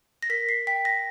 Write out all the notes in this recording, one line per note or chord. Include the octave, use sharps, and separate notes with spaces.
A#6
A#4 B6
C7
G5 B6
A#6